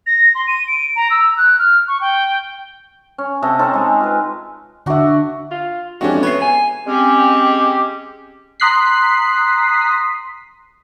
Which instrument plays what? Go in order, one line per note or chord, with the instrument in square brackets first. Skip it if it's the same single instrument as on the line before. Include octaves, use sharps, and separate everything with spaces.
[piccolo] A#6
C6
D#7
D7
A#5
E6
F#6
F6
C#6
G5
[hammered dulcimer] C#4
C3 A4 D#5
C4 C#4 D#4 A4
G#3 G#5
F4 B4
[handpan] D3 E5 [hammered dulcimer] D4 F#4
[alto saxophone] F4
[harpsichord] F2 E3 G#3 [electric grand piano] C#4 D4 F#4 [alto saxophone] G4
[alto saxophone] B3 [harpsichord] B4 E5 [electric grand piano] C#5 C7
[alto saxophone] G#5
[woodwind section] G#3 C4 C#4 [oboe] G4
[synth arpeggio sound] A#5 C6 D#6 F#6 B6 C7